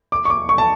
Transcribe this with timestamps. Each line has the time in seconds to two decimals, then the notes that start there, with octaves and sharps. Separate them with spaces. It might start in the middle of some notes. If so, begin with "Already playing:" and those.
0.12 D6
0.25 C#6
0.30 D6
0.49 C#6
0.58 A5